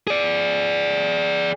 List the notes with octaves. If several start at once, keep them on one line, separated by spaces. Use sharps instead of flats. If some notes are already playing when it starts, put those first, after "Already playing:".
G#4 D5